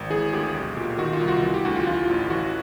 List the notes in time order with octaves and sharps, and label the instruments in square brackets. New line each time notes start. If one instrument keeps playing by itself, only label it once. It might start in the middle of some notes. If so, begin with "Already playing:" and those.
Already playing: [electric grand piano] G#1
E3 G#4
D2 G4
B1
A#2
D#3 F#4
F4
C2
F#4
E3
G4
D2 F#4
F4
E3 F4
A1
E3 F#4